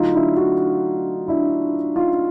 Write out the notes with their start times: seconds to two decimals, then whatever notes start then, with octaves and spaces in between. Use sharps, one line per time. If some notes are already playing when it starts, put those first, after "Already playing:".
Already playing: D3 F#3 A3 D#4 F4
0.14 D4 E4
0.37 E4 F#4
1.28 D4 E4
1.96 D#4 F4